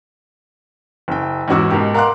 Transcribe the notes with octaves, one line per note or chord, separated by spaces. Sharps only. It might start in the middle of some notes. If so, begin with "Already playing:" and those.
F#1 G5
E2 G#2 C#4 F#4 D6 E6
G#2 B2 A#3 G4
A#4 F5 F#5 C6 D6 F#6